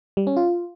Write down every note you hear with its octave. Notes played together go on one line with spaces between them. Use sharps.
G3
C#4
F4